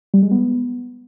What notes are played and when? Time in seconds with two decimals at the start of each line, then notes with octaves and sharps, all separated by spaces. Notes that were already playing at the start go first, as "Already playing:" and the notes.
0.14 G3
0.22 G#3
0.31 B3